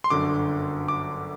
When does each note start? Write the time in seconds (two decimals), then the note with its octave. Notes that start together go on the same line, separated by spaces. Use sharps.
0.04 C6
0.10 G1 F#2 D3 D6
0.88 D6